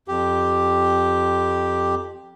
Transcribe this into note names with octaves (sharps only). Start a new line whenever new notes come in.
F2 G4